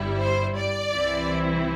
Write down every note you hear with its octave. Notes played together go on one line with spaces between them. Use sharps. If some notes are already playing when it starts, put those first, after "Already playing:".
Already playing: G1 G2 G3 E4
C5
D5
C2 C3 E3 C4 E4